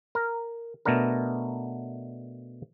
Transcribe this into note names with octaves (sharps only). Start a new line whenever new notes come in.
A#4
B2 A3 B3 D4 A#4